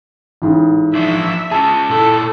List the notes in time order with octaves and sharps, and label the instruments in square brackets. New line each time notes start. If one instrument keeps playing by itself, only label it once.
[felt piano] A1 G#2
[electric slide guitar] F3 D4 [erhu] E5
[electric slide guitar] C#4 F4 G#4 [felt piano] A5
[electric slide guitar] A#2 E4 [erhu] A4